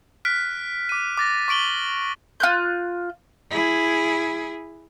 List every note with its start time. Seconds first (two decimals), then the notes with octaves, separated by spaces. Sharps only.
0.25 F6 F#6 B6 D7
0.89 D6 D#7
1.17 D6 A6 A#6
1.48 C#6 D6 D7 F#7 G7
2.40 F4 F#6 G6
3.51 E4 G#4